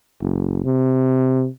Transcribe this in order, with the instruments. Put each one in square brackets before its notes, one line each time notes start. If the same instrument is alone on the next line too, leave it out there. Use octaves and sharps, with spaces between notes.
[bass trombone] F#1
C3